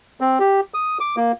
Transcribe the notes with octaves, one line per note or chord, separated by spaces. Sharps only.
C4
G4
D#6
D6
A#3